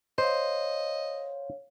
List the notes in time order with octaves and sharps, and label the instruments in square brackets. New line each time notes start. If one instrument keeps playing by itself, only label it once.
[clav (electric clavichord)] C5 [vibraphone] C#5 F5 [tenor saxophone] D#5